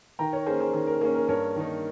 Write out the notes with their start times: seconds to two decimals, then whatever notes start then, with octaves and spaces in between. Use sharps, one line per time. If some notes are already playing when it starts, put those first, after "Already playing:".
0.19 D#3 G5 A#5
0.33 A#4 C#5
0.46 A#3 C#4 G#4 C5
0.60 G#4 C5
0.73 D#3 G#4
0.87 A#4
1.01 A#3 C#4 G#4
1.15 A#4
1.28 G2 A#4 C#5
1.56 D#3 A#3 D#4